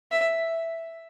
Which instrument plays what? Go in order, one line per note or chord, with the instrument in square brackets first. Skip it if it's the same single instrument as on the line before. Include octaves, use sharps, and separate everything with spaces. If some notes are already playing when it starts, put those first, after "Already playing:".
[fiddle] E5